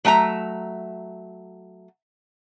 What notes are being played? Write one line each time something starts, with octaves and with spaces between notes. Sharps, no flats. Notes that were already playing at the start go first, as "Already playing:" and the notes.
F#3 A3 E5 A#5